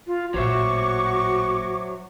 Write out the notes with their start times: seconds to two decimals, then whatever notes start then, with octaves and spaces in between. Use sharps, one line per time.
0.07 F4
0.34 A1 A#2 F#3 F#4 C5 E5 C#6 D6